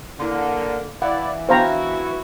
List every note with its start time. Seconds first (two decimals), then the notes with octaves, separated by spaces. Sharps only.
0.20 D3 A#3 E4 C6
1.02 E3 E4 D5 F5 F#5 D6
1.49 B3 D4 E4 F#4 C5 F5 G5 A#5